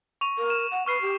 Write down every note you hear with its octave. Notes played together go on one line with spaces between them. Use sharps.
C#6 F7
A#4
E7
F#5
B4 C#6 F6 C7
G4